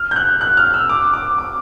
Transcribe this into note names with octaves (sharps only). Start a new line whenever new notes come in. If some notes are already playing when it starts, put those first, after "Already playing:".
Already playing: F6
G6
F#6
F#6
F6
E6
D6
D6
D6